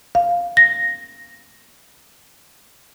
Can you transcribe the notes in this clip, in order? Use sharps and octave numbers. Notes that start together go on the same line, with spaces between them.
F5
A#6